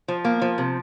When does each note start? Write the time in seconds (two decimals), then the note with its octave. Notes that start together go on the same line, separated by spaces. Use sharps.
0.08 F3
0.25 A#3
0.42 F3
0.58 C3